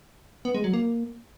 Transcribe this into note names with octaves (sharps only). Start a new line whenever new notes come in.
B3
G#3
F#3
A#3